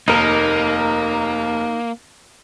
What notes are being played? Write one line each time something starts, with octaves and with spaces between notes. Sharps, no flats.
F1 D#2 A#3 D#4 A#4